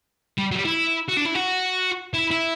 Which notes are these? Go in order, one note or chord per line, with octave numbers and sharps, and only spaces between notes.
G3
F#3
G3
E4
F#4
D4
E4
F#4
E4
E4